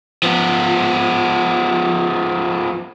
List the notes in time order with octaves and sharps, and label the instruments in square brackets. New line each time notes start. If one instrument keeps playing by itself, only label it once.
[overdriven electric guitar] F3 B3